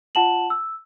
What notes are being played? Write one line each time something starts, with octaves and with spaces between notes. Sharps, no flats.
F4 F#5 A5 E7 F#7
E6